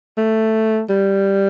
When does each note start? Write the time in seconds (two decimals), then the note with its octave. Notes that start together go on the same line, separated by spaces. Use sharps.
0.18 A3
0.89 G3